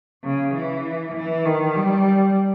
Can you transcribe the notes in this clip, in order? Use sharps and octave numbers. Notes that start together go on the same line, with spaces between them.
C#3
E3
E3
D#3
G3